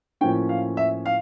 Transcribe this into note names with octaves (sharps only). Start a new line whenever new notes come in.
A2 F3 A#3 C#4 G5
F5
E5
F5